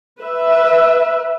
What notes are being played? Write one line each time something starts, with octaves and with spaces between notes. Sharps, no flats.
B4 E5